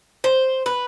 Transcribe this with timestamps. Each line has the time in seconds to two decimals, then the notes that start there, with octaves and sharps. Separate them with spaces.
0.24 C5
0.66 B4